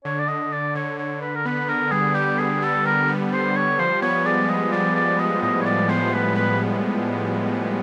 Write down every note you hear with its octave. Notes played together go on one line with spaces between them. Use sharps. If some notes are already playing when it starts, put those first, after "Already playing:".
D3 C#5
D5
D3 D#5
D3 D5
D3 C#5
D3 C#5
D3 B4
A#4
B3 B4
D3 A#4
G3 G#4
G3 G4
D3 G#4
G3 A4
D3 A#4
B3
D3 C5
G3 C#5
F3 C5
B3 C#5
G#3 D5
F3 D#5
F3 D5
B3 D5
B3 D#5
A2 D#5
C#5
B3 D5
B3 C5
F3 B4
B3 B4